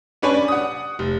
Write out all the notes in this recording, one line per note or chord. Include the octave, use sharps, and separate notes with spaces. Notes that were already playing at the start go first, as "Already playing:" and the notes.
C#4 D4 B4 C#5 G#5
D5
F#5 D#6
F1